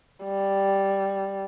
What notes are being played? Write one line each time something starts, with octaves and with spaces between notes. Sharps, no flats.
G3